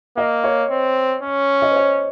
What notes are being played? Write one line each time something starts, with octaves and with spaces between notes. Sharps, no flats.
A#3 D#5
C#5
C4
C#4
D#5
C5
C#5